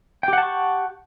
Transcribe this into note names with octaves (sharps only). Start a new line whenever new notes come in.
G4 F#5 G5 A5 C#6